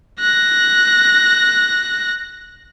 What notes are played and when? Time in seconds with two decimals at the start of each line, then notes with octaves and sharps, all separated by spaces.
0.20 F#6 A#6